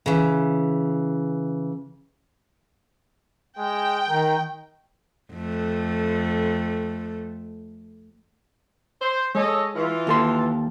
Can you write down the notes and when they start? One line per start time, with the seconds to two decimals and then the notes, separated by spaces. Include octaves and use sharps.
0.06 C#3 E3
3.58 G#3 G5
4.09 D#3 A#4
5.33 F2 A3
9.01 C5
9.35 G#3 A4 C#5 D#5
9.76 E3 F4
10.07 D#2 A4 C6